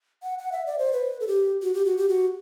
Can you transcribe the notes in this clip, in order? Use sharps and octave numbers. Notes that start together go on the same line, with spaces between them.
F#5
F#5
E5
D5
C5
B4
A4
G4
F#4
G4
F#4
G4
F#4